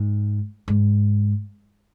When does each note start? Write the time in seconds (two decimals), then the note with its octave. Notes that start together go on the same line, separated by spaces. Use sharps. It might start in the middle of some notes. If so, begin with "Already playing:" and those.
Already playing: G#2
0.68 G#2